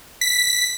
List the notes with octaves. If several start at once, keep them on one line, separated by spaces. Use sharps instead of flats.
B6